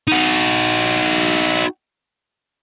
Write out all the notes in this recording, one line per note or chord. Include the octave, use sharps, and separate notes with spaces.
D#4 F#4